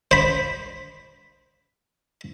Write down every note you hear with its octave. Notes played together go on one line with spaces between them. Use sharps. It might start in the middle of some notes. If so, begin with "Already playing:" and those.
C5 B5